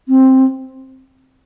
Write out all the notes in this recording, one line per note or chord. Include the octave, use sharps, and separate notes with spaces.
C4